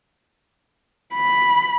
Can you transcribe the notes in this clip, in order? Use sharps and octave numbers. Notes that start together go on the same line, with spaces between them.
B5